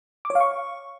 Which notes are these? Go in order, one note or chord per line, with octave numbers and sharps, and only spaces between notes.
D6
C#5
F5
C#6